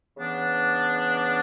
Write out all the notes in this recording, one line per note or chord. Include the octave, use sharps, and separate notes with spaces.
C#3 E3 B3 D4